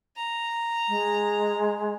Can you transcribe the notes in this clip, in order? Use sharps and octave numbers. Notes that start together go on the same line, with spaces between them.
A#5
G#3